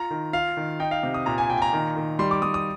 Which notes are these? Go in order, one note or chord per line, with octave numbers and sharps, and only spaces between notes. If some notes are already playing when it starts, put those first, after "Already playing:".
Already playing: F4 A#5
D#3
F4 F5
D#3
D#4 G5
F5
C3
D#6
A#2 A#5
G#5
A#2 G5
G#5
A#5
D#3
D#3
G3 C6
D6
G3 D#6
D#6